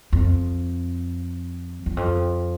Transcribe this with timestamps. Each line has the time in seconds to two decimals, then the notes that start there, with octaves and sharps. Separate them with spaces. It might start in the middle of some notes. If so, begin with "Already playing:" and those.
0.13 F2
1.86 E2
1.97 F2